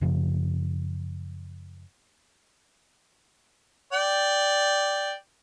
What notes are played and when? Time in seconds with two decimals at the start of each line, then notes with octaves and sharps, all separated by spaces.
0.01 F#2 C#3 F3
3.93 D5 G5